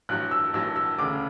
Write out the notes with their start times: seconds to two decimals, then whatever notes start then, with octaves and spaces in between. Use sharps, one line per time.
0.09 A1 G2 F#3 F#6
0.31 E6
0.54 A1 G2 F#3 E6
0.76 E6
0.98 E1 D2 C#3 D6